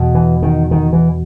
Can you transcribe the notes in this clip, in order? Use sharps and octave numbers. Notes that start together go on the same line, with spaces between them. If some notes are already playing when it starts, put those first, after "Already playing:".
Already playing: E2 B2
E3
D#3
D#3
E3